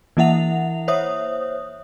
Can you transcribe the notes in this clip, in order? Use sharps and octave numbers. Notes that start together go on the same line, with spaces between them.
E3 A#3 E4 E5 F#5 F7
C5 C#5 E5 D#6